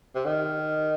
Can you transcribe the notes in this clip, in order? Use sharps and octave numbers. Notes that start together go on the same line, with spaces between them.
C3
D#3